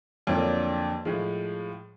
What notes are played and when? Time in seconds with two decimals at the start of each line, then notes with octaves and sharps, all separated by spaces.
0.27 F2 D3 F#3 A#3 D4
1.05 A2 F3 G#3